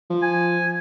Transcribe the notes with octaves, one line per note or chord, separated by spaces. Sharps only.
F3
G#5